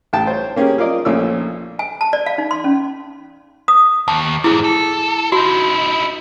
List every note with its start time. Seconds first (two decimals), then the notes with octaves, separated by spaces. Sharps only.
0.13 A1 G5 A5
0.27 C5 C#5
0.56 A#3 C#4 G4 G#4 A#4
0.78 F4 A#4 D5 D#5
1.05 A#1 F3 A3 C#4 D5 E6
1.79 G#5
2.01 A5
2.13 D5
2.26 F5
2.38 D#4
2.51 C6
2.64 C#4
3.68 D#6
4.08 D#2 A5
4.44 E2 G#2 E4 G#4
4.64 A4
5.32 D#4 E4 F#4